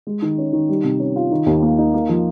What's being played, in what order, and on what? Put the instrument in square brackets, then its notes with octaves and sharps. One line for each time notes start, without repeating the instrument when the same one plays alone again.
[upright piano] G#3
D#3
C#4
D#3
G3
C3
C#4
F4
D#3
D#2
A#3
D#4
A#3
F3